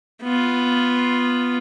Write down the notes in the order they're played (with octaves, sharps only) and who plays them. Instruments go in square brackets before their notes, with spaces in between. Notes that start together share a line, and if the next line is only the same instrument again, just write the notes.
[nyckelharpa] B3 F4